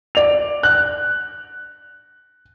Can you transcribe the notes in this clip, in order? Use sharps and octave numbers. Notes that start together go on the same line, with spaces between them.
D5 F7
F#6